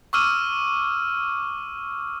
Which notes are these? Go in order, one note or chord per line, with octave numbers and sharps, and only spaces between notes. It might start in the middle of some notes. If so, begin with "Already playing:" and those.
C#6 D6 E6 F6 D#7